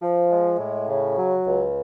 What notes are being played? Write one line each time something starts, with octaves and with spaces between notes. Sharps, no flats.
F3
G#3
A2
C#3
F#3
C#2